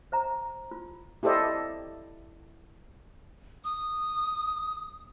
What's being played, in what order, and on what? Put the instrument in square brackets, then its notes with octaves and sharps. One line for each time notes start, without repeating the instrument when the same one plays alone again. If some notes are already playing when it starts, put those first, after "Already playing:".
[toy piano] C5 E5 A#5
F4
[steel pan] E4 G4 A4 C5 D5 D#5
[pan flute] D#6